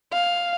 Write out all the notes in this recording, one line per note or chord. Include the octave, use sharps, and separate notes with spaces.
F5